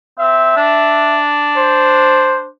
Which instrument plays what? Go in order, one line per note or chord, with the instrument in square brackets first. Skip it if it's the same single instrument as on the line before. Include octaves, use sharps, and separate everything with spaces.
[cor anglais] C4 [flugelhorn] E5
[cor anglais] D4
[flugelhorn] C5